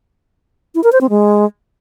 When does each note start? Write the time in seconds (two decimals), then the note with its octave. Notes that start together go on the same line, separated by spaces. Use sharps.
0.75 E4
0.83 A#4
0.92 C5
1.01 C4
1.10 G#3